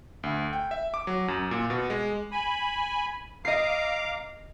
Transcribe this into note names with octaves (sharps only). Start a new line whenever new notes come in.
D2
G5
E5
D6
F#3
F#2
A#2
B2
G#3
G#5 B5
D#5 F5 A#5 D6 C7